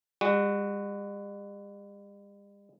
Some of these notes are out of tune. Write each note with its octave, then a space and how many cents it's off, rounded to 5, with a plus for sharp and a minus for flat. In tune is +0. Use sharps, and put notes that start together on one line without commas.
G3 +45 F#4 +0